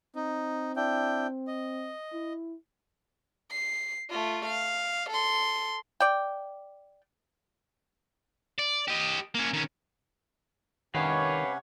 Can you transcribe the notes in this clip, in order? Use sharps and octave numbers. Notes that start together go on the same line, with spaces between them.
C4 D#4
D4 E4 G5
D#5
E4
C7
A3 F4
F5
A4 C6
D5 G5
D5
G4 D#5
A#3 C#4
D#3 C#4
C3 D#3 C#4 G4 B4 C#5 F5 F#5